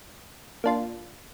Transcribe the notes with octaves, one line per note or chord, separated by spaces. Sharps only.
A#3 D4 F4